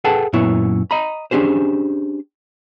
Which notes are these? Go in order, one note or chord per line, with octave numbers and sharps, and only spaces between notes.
G#4 A4 B4 F#5 G5 A5
F#2 A#2 B3 E4 C#5
D#5 A#5 B5
C#4 D4 G4 G#4 C5